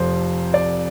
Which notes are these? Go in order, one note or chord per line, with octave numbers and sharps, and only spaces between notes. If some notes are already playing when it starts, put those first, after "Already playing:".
Already playing: F1 F2 C3 F3 C5
D5